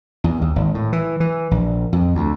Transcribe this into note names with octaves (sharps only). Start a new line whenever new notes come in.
E2
D#2
G#1
A2
E3
E3
A#1
F2
D2